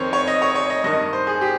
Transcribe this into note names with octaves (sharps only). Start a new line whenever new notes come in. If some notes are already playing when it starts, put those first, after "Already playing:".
Already playing: F2 D#3 C5 C#5
C#5
D#5
C#5
C#5
D#5
G2 D#3 D#5
C5
G#4
G4